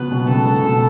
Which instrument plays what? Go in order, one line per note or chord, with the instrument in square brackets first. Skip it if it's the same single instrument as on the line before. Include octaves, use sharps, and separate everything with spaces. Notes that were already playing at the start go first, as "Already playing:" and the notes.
Already playing: [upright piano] C#2 F#3 B3 [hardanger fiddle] B4
[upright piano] B2
[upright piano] C#2 [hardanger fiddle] A4
[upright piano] B2
B2